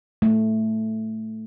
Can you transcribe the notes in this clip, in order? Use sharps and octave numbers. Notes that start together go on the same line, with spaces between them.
A3